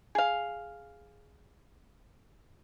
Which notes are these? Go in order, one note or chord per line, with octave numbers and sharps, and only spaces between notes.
G#4 F5